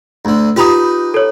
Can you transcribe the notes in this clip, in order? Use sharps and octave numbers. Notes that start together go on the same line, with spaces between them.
D2 D3
D#4 F4 G4 B4 B5 D#6
A4 C#5